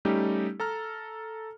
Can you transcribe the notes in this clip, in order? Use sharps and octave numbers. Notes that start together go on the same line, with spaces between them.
G3 A3 C#4 D#4 G4
A4 A#5 F6